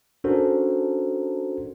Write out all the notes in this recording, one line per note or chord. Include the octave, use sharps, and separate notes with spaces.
C#4 D4 F#4 A4 A#4 C5